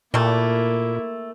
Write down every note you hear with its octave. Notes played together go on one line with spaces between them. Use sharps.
A#2 G3 A3 A#3 E4